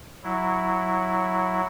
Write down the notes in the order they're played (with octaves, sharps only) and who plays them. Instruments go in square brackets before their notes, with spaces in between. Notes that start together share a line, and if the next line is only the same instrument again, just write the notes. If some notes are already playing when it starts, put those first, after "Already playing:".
[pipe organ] F#3 E4